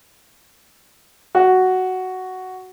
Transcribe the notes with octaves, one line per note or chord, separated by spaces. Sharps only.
F#4